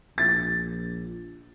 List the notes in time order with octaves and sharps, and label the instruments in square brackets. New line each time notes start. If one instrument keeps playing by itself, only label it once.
[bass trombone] A#1 [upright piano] A6